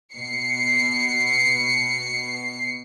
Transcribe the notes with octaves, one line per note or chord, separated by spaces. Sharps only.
B2 C7 C#7